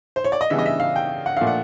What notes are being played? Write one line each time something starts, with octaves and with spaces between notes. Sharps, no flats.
C5
C#5
D5
D#5
C#3 E3 G3 B3 D4 E5
D#5
E5
F5
G5
F#5
A#2 F3 A3 D4 F5
F#5